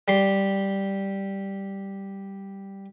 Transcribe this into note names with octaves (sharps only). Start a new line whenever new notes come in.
G3 C6